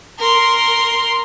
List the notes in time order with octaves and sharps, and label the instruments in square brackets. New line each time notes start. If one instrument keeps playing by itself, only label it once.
[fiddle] A#4 C6